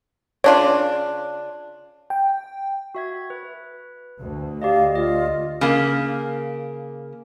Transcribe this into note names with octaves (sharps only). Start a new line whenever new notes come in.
C#3 D4 F4 C#5
G5
F#4 E5 G#6
B4
D2
G4 D5 D#5 F5
F4 D5 D#5
C#3 A#3